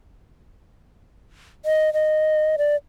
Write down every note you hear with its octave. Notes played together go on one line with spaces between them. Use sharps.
D#5
D#5
D5